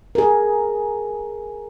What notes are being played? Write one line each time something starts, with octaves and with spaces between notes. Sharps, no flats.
G#4 A#4